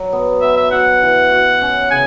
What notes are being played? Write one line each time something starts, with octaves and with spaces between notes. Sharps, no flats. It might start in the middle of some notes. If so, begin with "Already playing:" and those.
Already playing: F#3
B3
B3 E5
E5
F#4 F#5
E3
F#4
C#4
C#3 G#5